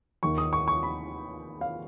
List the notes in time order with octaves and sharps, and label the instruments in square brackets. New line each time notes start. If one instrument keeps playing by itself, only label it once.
[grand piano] D#2 D#3 A#3 C#6
D#6
C#6
C#6
B5
F5